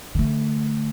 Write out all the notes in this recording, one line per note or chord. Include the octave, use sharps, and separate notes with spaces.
D3 A3